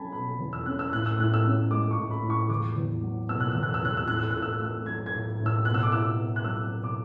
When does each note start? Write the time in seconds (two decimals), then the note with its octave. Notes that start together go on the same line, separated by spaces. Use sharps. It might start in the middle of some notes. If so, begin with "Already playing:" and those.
Already playing: F#3 C#4 G#5 A5 B5
0.13 B2 B5
0.39 E2
0.53 E6
0.65 C#4 F#6
0.79 E6
0.92 A2 F#6
1.06 E6
1.18 A2 F#6
1.34 E6
1.45 C#4
1.71 G#3 D6
1.91 C#6
1.97 A2
2.11 B5
2.23 A2
2.30 C#6
2.49 E2 D6
2.76 E2
3.02 F#3
3.29 B2 E6
3.40 F#6
3.51 E2 E6
3.63 F#6
3.74 E6
3.82 E2 F#6
3.97 E6
4.08 A2 F#6
4.19 E6
4.30 A2 F#6
4.42 E6
4.53 F#6
4.60 A3 E6
4.86 F#3 G#6
5.06 G#6
5.13 A2
5.40 A2
5.46 E6
5.65 B2 F#6
5.74 E6
5.83 D6
5.92 E4 E6
6.19 B3
6.36 F#6
6.44 F#3 E6
6.70 B2
6.84 D6